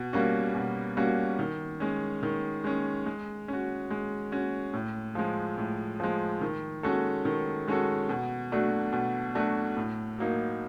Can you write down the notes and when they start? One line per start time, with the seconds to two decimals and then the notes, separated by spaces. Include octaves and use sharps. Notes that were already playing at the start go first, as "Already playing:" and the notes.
Already playing: B2
0.13 G3 A#3 C#4 F#4
0.55 B2
0.97 G3 A#3 C#4 F#4
1.39 D#3
1.80 G#3 C#4
2.23 D#3
2.64 G#3 C#4
3.06 G#3
3.48 C#4 F#4
3.90 G#3
4.32 C#4 F#4
4.73 A2
5.15 F3 G#3
5.58 A2
6.00 F3 G#3
6.41 D#3
6.83 G#3 C#4 F#4 A4
7.25 D#3
7.68 G#3 C#4 F#4 A4
8.09 B2
8.52 F#3 A3 D4 F#4
8.93 B2
9.35 F#3 A3 D4 F#4
9.77 A2
10.19 F#3 A#3 D#4